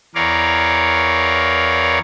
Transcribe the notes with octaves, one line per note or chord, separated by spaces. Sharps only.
E2 A#4 C#5 D5 F5